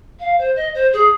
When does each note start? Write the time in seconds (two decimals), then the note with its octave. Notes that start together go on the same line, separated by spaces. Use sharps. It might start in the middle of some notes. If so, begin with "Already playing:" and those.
0.20 F5
0.39 C5
0.56 D#5
0.74 C5
0.93 G#4